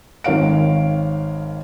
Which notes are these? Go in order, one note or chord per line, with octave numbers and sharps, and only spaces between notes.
G#1 D#3 C#5 F5 D7